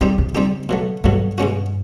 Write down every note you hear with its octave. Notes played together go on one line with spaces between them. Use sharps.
D3 G3 C4 D#4 G4
C#3
G3 C4 D#4 G4
B2 F#3 A3
G2 B2 F#3 A3
B2 G#3 C#4 F#4